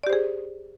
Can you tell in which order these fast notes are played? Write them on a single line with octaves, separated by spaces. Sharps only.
D5 G4 C5 G#4